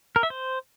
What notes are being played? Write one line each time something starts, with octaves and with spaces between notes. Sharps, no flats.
A#4
E5
C5